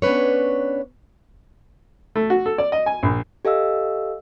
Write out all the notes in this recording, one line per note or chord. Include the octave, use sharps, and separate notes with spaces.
B3 C#4 D4 B4 C#5
A3
F#4
A4
D5
D#5
G#5
A#1
G4 A4 D#5 F5 E6